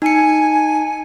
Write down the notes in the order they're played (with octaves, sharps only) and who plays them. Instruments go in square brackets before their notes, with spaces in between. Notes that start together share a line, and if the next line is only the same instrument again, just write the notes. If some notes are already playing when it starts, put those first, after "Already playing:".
[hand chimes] D#4 C#7 [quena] G#5